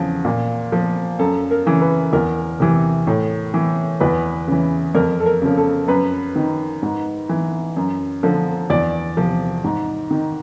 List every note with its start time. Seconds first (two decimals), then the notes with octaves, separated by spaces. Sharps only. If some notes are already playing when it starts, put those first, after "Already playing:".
Already playing: E2 C#3 F3
0.25 A#2
0.72 F3
1.19 F#2 A4
1.51 A#4
1.66 C#3 E3
1.81 B4
2.13 E2 A#4
2.60 C3 E3
3.07 A2
3.54 E3
4.00 E2 B4
4.48 C#3 E3
4.95 F2 A#4
5.20 A4
5.26 A#4
5.42 C#3 F3
5.58 A4
5.88 F#2 B4
6.36 D#3
6.82 G#2
7.29 E3
7.77 F#2
8.23 D3 F3
8.70 E2 D5
9.17 C3 F3
9.64 G#2
10.11 D#3